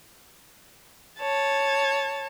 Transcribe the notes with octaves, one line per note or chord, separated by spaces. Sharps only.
C#5 A5